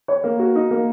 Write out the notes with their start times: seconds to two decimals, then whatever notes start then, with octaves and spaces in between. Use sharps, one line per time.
0.08 C#5
0.24 A#3
0.39 F#4
0.55 D#4
0.71 A#3